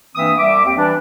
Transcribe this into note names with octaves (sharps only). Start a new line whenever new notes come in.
G2 E3 A#3 C4 E5 D#6
C2 E5 D6
D#2 C4 D6
E3 G3 D4